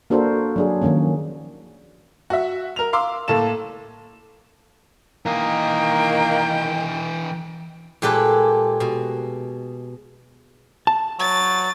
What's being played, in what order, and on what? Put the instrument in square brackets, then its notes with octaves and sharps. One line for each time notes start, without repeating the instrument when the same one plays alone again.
[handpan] A#3 D4 F#4 A4 A#4 C5
F#3 D4 G#4
D#3 F3 F#3 A#3 C#4
[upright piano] F#4 E5
A#4 F7
F5 C6 D6 E6
A2 A#3 A4 E7
[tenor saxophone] D#3 [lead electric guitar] E3 D#5 [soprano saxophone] A#3 [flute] G5
[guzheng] A#2 G#3 G4 A4 B4
B2
[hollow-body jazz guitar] A5
[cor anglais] F#3 [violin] A6